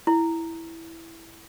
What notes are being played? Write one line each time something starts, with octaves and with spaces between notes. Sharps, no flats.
E4